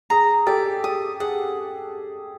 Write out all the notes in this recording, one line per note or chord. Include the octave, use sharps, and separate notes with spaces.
G#4 A#5
G4 A4 D5
G4 D#6
G#4 F#5